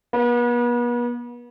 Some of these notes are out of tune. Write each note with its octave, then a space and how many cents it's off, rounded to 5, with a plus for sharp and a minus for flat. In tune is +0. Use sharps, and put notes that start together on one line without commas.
B3 -40